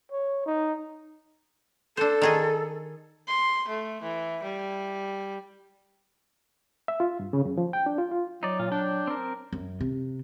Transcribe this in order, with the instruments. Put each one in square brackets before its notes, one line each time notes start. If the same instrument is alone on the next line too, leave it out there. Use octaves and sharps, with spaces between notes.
[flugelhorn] C#5
D#4
[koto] D4 C5 [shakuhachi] A4
[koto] D#3 G#4 D#5
[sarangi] C6
A3
E3
G3
[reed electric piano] E5
F4
G2
C#3
F#2
F3
G5
D4
F4
F4
[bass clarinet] F#3 [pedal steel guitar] D#4 D5
[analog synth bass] A#2 [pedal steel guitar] F4
[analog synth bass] D4 [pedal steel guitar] G5
[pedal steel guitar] C4 A#4
[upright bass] F#2
C3